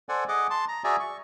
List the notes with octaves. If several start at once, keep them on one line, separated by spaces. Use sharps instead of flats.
A4 C5 D5 F#5 G#5
G#4 D#5 F#5 D6
A5 C6
A#5
F#4 G#4 D5 E5 G#5 A#5
C#6